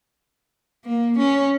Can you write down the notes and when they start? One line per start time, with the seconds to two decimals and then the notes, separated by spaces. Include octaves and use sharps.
0.85 A#3
1.18 C#4